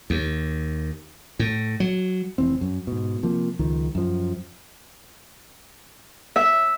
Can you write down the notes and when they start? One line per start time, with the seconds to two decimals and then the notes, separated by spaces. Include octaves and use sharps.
0.10 D#2
1.39 A2
1.80 F#3
2.38 F1 C#2 E3 C4
2.61 F#2
2.87 G#2 B2
3.23 C3 F3 A#3
3.59 C#2 D#3 F3
3.95 F#2 F3
6.36 E5